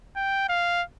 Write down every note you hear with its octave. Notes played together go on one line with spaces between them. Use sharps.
G5
F5